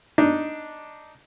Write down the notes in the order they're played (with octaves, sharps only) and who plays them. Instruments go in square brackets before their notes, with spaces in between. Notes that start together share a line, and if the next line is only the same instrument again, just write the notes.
[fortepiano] D4 D#4